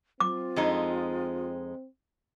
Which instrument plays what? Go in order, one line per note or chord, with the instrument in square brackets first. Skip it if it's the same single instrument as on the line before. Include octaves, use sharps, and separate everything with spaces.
[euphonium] C4 [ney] F4 [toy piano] D6
[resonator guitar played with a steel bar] F2 G#3 D#4